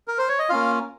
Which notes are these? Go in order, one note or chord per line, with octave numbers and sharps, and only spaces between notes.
A#4
C5
C#5
D#5
A#3 C#4 F4 F5